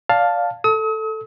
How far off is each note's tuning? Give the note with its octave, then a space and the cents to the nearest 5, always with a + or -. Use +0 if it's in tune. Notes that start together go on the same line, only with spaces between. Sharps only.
D5 -20 F5 +10 A5 +0
A4 +0 D#6 +45